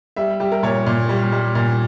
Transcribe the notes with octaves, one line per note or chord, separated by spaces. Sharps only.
G3 E5
G3 G4
A#4
A#2 C#5
A#2
G3
G3
A#2